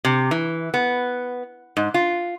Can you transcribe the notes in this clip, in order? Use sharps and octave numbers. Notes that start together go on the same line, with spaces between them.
C3
E3
B3
G#2
F4